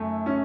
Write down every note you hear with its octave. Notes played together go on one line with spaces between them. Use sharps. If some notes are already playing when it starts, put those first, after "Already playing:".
Already playing: F#2 A3
C#4